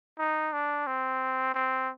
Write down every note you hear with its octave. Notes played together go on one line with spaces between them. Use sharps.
D#4
D4
C4
C4